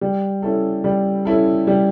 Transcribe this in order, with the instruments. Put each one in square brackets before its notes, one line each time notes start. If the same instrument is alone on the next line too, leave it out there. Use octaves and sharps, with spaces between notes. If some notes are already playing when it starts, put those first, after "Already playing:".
[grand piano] G3
C#4 E4 A4
G3
C#4 E4 A4
G3